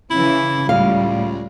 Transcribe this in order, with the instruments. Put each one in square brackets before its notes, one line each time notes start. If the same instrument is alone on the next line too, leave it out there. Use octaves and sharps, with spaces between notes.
[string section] C#3 E3 [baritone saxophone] E4
[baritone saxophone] C#2 [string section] A2 G3 [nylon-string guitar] F5